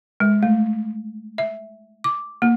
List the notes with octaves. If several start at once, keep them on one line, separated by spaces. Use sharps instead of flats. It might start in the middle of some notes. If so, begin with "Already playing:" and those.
G#3
A3
E5
D6
A#3